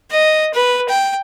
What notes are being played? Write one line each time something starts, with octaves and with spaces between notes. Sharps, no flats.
D#5
B4
G5